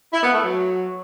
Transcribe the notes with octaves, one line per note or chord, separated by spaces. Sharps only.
E4
B3
A3
F#3